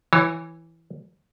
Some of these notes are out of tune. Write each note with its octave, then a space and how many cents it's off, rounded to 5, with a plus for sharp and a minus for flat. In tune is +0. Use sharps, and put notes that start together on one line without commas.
E3 +0 C#5 -20